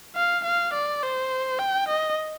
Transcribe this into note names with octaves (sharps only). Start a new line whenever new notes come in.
F5
F5
D5
C5
G5
D#5